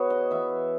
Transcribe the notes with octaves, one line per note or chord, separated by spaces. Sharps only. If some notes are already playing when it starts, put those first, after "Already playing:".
Already playing: B3 F#4 G#4 B4 C#5
D#5
E3 B3 E5